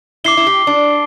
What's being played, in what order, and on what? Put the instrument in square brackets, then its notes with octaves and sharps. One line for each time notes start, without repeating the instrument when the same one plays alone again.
[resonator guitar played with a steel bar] E4 [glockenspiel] D6 C7 G7
[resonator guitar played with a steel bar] E4
G4
D4